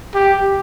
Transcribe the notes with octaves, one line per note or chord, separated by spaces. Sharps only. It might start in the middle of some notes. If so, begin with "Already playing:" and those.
G4